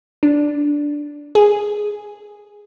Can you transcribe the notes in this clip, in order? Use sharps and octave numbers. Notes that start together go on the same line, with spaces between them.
D4
G#4